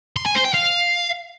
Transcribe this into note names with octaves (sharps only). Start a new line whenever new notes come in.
C6
G#5
C5
G5
F5